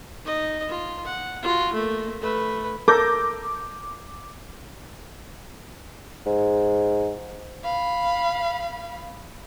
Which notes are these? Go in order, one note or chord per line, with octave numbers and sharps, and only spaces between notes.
D#4 D#5
F4
F#5
F4 F#4
A3 A#3
A3 B4
A4 A#4 D6 G6 A#6
G#2
F5 B5